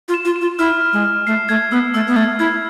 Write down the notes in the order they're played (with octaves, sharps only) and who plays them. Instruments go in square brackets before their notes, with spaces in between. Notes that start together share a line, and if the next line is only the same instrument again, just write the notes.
[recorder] F4
[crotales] E7
[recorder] F4
[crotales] E7
[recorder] F4
[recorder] E4 [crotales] F6
[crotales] F6
[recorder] G#3
[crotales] F6
[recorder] A3 [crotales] C7
[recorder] A3 [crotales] G#6
[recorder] B3 [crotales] E6
[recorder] A3 [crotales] E6
[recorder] B3
[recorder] A3 [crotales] G#6
[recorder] E4 [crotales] G#6